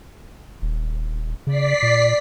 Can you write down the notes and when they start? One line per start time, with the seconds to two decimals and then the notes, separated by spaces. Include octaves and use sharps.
0.62 D#1
1.47 C#3 D5 B6 C7
1.82 A#2